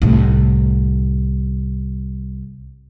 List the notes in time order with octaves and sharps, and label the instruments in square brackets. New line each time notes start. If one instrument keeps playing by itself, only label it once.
[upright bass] C2 A2